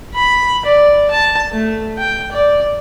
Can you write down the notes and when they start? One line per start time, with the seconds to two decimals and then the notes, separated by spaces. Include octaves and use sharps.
0.14 B5
0.65 D5
1.11 A5
1.51 A3
1.98 G5
2.32 D5